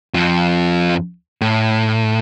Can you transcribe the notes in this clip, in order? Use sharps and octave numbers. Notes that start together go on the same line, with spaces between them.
F2 F3
A2